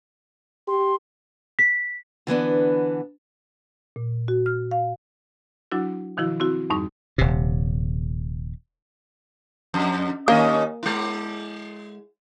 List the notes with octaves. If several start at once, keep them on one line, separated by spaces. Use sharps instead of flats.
G4 C6
B6
D3 E3 B3 D4
A#2
F#4
F6
F5
F#3 D4 E4 F#4
B2 D#3 F3 E4 F#4
C4 E4 F#4
F2 G#2 G3 D#4 C#6
D#1 C3
F2
D#2 A#3 C#4 D#5
G#3 E4